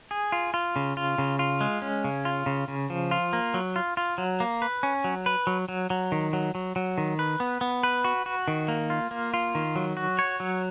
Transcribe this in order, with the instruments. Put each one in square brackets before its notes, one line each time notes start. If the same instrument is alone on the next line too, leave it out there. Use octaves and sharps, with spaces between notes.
[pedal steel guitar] G#4
F4
F4
C#3
F4
C#3
F4
G#3
C#4
C#3
F4
C#3
C#3
F3
F4
A#3
F#3
F4
F4
F#3
A#3
B4
C#4
F#3
B4
F#3
F#3
F#3
D#3
F#3
F#3
F#3
D#3
B4
B3
B3
B4
F#4
F#4
D#3
A#3
F4
A#3
F4
D#3
F#3
F#4
C#5
F#3